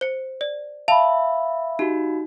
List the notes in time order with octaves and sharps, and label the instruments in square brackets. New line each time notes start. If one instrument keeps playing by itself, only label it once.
[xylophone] C5 C#7
D5
[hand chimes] E5 [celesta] F5 B5 [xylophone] A5 F7
[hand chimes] D#4 F#4 [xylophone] G4